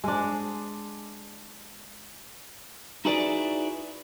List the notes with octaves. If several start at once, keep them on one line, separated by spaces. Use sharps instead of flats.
G#3 D4
D#4 E4 F#4 G#4 B4 D5